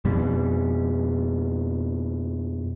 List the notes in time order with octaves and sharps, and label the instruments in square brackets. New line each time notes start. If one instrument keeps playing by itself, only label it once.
[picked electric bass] F2 B2 G3